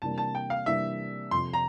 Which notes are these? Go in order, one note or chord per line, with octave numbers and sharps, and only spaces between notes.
C3 E3 G3 A#3 D4 A5
A5
G5
F5
C3 E3 G3 A#3 D4 E5
F2 C3 F3 C6
A#5